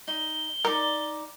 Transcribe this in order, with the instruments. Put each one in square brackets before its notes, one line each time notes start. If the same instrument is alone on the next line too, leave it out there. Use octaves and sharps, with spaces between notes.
[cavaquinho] D#4 [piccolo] G7
[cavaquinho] D#4 D5 [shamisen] A#4